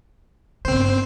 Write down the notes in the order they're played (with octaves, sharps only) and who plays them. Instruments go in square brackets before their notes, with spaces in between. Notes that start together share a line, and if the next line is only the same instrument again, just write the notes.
[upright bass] G1 C#3 [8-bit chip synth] C4 C5